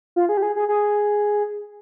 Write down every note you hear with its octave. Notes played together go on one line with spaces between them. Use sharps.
F4
G#4
G4
G#4
G#4
G#4